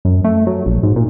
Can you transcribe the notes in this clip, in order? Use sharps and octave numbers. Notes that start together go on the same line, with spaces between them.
F#2
A3
F#3
A#1
G#2
A#2